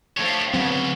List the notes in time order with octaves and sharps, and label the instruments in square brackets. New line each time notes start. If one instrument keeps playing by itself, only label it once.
[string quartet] F3 A3 D4 [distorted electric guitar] G4 C#5
[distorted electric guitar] D2 C#3 [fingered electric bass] F#3 C4 [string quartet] B3